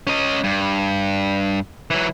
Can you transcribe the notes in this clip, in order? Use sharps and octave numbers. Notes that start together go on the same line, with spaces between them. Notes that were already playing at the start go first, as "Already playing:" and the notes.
C#4 D#5
G2
E3 F#3